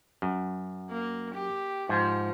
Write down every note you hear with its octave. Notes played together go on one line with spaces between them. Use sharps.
F#2
A#3
G4
G#2 F3